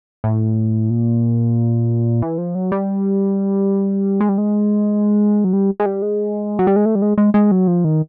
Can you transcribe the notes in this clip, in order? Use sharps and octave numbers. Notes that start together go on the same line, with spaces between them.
A2
A#2
E3
F3
F#3
G3
G#3
G3
G#3
F#3
G3
G#3
G3
G#3
F#3
G3
G#3
A3
G3
G#3
G#3
G#3
F#3
F3
D#3